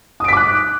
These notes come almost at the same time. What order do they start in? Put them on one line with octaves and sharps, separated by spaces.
D#6 D7 B6 D6 F#6